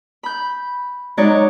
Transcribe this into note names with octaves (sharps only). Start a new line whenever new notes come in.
B5 G6
F#3 G#3 D#4 C#5 D5